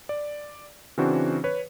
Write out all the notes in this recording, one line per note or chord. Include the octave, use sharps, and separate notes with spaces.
D5
C#3 E3 C4 D4 F#4 C5
B4 C#5